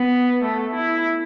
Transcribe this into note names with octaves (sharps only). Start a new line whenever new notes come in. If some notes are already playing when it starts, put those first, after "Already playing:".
Already playing: B3
A3
E4